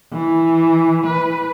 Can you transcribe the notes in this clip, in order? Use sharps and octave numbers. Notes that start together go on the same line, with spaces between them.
E3
B4